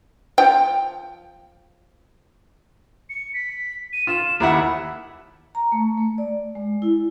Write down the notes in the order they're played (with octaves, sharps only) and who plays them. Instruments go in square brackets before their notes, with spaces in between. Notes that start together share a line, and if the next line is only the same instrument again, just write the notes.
[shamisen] F3 G5
[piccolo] C#7
B6
D#7
[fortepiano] F4 [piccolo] E7
[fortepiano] D#2 E4 F#5 [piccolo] B5
[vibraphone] A#5
A3
A3
D5
G#3
E4